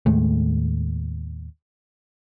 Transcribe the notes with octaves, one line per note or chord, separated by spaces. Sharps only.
D#2 A2 G#3 A3